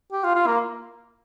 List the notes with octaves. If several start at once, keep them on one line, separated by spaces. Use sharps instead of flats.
G4
F4
F4
A#3